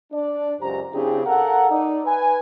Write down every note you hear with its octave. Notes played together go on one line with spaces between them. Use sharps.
D4 D5
C#2 F#2 G4 C5 A#5
C#3 C4 D4 E4 G4 G#4
A4 A#4 F5 F#5
D#4 D5
B4 G#5